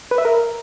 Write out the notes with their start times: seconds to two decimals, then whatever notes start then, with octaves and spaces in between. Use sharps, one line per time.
0.11 B4
0.18 E5
0.25 A#4